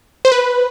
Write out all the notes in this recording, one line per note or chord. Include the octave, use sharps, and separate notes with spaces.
C5
B4